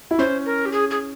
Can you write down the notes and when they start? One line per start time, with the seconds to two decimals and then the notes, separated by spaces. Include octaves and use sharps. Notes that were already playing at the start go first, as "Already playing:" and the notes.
0.11 E4
0.19 C#4 C5
0.45 A#4
0.66 G4
0.72 G#4
0.90 G#4